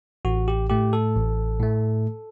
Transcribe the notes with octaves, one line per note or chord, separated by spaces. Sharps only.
A1 F#4
G4
A2 A3 G4
A4
A1
A2 A3